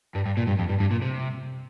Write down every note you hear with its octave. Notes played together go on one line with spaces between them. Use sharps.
G2
G2
A#2
G2
F2
G2
G2
A#2
C3